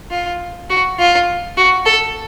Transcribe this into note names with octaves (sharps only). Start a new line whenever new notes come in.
F4
F#4
F4
F#4
A4